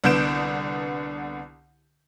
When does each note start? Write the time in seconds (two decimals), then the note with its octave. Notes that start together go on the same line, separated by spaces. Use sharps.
0.04 C2 D3 B3 G6 D7 E7